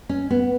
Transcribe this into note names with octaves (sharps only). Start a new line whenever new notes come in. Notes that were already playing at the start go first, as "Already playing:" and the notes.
C#4
B3